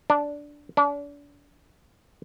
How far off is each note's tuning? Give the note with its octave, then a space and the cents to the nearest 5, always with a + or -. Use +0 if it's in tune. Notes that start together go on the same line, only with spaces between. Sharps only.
D4 -5
D4 -35